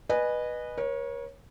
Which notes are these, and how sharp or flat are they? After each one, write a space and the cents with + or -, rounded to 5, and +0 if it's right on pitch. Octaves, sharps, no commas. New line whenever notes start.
B4 -10 D#5 -25 G#5 +0
A#4 +40 C#5 -15